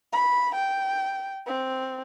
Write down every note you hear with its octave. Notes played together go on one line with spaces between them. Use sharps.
B5
G5
C4